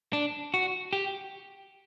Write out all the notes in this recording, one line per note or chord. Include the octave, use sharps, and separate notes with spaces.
D4
F#4
G4